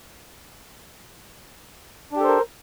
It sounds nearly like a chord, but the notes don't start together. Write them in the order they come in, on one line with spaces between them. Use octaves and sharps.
D4 G4 A4 C5 A#4